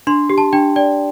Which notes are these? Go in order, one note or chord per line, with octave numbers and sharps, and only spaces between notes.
D4 C6
G4
A5
D4 G5
D5 G5